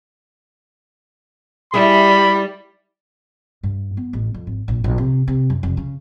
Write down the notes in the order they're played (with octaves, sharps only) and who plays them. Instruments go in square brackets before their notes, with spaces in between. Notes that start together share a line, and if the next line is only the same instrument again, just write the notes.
[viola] G3 [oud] E4 G#4 [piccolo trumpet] B5
[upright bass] G2
B3
A1
F2
G#1
A#1
A#1
C3
C3
F#2
F1
C#3